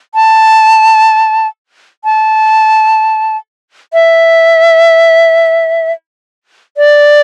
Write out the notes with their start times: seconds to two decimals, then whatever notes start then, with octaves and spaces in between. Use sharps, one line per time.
0.15 A5
2.04 A5
3.93 E5
6.77 D5